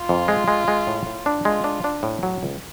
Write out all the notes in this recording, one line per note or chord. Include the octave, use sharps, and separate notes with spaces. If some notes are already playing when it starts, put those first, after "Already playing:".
Already playing: F4
F2
G#3
G#3
G#3
A2
A2
D4
G#3 F4
D4
D4
A2
F#3
C#2